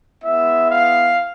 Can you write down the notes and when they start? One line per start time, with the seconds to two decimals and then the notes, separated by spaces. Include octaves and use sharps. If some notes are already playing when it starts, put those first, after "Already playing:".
0.24 G#3 B3 E4 E5
0.69 F5